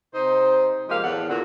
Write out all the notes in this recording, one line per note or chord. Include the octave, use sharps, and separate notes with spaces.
C3 D#4 C5
F3 G#3 A#3 G4 F5
E2 A2 A4 A#4 F#5
E2 A#2 D3 F#4